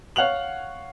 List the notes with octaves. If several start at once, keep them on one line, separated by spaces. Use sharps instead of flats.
C#5 F5 F#5 F#6 F7 F#7